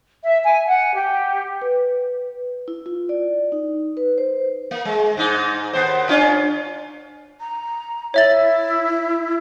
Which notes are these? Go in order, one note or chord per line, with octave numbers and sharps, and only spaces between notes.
E5
G#5
F#5
G4
B4
E4
F4
D5
D#4
B4
C5
A#3
G#3
G#2 D#4
D#2 B3 C5
C#4 D4 F4
A#5
E4 C#5 E5 A6